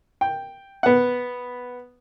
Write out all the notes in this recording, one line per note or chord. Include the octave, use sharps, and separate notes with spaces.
G5
B3 F#5